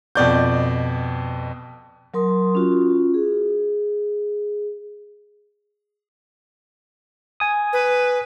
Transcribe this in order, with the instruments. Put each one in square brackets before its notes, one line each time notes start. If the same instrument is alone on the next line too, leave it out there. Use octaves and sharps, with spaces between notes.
[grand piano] F2 B2 D5 G6
[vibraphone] F#3 A#4 C6 D#6
C#4 F4 F#4
G#4
[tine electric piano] G#5 D#6
[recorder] B4